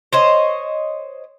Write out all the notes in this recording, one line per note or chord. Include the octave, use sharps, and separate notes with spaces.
C5 C#5 D#5